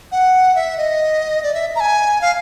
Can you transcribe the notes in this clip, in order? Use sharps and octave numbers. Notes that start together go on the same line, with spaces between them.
F#5
E5
D#5
D5
E5
A#5
G#5
F5